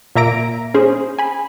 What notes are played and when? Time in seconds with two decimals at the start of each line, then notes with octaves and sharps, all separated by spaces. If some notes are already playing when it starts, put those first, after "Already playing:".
0.16 A#2 A#3 E5 A#5 A#6 D7
0.74 C#4 G#4 C5
1.19 G#5 B5